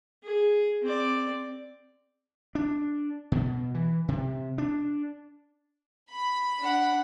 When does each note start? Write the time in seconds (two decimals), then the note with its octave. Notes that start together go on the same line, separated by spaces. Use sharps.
0.23 G#4
0.82 C4 D5
2.55 D4
3.32 B2
3.74 E3
4.08 C3
4.58 D4
6.12 B5
6.59 D4 F#5